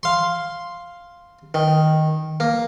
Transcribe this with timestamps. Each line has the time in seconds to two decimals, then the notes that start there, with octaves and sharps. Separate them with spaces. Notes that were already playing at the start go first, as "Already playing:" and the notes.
0.03 F5 C6
1.54 D#3
2.40 A#3